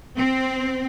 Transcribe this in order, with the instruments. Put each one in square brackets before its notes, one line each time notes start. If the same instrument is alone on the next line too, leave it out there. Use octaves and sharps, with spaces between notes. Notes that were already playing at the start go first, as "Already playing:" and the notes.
[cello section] C4